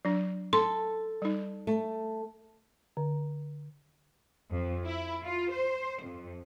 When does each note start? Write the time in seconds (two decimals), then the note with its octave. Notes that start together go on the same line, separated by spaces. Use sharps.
0.05 F#3 D4
0.53 A4 C6
1.22 G3 D#4
1.67 A3
2.97 D3
4.51 F2
4.87 E4
5.24 F4
5.52 C5
6.03 F2